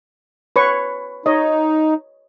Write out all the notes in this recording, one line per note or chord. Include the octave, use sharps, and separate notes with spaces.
B4 C#5 C#6
D#4 C#5 D#5